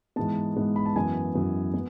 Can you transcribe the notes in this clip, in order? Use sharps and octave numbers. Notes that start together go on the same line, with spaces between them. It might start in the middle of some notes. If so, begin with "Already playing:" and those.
G#2 E3 G#3 B3 A5
G#2 E3 G#3 B3
B5
A5
F#2 E3 B3 G#5
F#2 E3 B3
B3